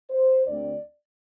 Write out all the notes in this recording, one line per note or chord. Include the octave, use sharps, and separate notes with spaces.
C5
D2 D3 A3 C4 D5